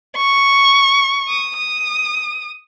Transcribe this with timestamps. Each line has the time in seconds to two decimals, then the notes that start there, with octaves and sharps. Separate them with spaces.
0.16 C#6
1.28 D#6
1.58 D#6